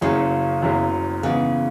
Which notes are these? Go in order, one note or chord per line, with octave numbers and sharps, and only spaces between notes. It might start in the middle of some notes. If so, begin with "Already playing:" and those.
F#1 F#2 C#3 F#3 E4 G#4
F#1 F#2 F#3 E4 G#4
G#2 C#3 E3 B3